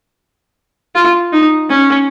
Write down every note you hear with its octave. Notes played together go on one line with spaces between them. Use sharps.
F4
D#4
C#4